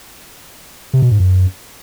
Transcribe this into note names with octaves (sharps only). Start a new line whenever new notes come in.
C3
B2
G#2
F#2